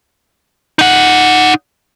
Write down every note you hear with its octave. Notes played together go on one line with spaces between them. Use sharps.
D#4 F#5